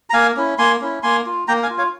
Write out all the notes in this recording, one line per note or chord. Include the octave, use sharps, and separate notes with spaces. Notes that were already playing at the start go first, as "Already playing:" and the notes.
A#5
A#3 F5 G#5
C#4 E4
A#3 G#5 C6
C#4 E4
A#3 G#5 C6
F4
A#3 G5 A#5
F5 G#5
F4
C#5 F5